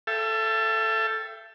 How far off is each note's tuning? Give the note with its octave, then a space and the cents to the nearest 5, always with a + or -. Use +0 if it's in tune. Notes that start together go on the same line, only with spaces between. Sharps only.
A4 +0 E5 +35 G5 +5